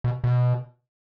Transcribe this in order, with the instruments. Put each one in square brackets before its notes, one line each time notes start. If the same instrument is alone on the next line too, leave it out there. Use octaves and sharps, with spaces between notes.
[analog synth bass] B2
B2